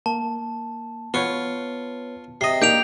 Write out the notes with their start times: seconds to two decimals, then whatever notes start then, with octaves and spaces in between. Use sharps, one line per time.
0.06 A#3 A5
1.14 B3 F4 B4 C#5 C#6
2.41 C3 D#5 C7
2.62 A#3 D4 D#4 G4 G6 D7 F7